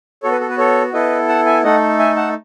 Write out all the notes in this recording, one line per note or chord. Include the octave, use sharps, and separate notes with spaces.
B3 F#4 A4 C#5
B4
A4
B4
A4 C#5
B3 E4 A4 B4 D#5
F#5 A5
E5 G#5
A3 D#4 A4 D#5 F#5
E5 G#5
F#5 A5